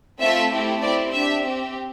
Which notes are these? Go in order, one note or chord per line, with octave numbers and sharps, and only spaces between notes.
A3 C4 F4 A4 E5
A3 C4 E4 G4
C4 E4 G4 D5
D4 G4 E5
C4 G4